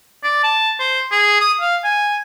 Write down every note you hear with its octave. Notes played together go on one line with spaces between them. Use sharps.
D5
A5
C5
G#4
D#6
F5
G#5